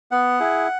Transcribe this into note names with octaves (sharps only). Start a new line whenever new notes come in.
B3 F#5
E4 G#4